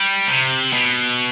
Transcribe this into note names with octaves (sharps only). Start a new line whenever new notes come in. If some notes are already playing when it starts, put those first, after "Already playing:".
Already playing: G3
C3
B2